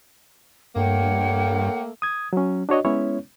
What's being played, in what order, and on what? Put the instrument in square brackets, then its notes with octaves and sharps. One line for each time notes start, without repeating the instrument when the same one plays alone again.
[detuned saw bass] G2 [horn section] A3 A#3 [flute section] C#5 F#5 G5
[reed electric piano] D#6 G#6
F#3 C#4
D4 F#4 C#5 D#5
G#3 B3 C#4 E4 C#5